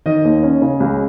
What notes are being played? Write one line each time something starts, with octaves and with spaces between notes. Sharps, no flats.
D#3 D#5
D#2
C#4
C#3
C#2